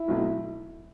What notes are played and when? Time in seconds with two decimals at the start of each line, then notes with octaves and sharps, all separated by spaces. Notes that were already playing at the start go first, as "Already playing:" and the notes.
Already playing: E4
0.08 B1 B2 F#3 A3 C4